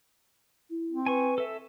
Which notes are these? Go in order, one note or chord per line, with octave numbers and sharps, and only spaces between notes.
E4
C4
B4 G#5 C#6
A4 E5